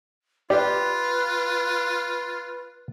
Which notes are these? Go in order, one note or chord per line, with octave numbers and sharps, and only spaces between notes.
F4 G4 B4 D5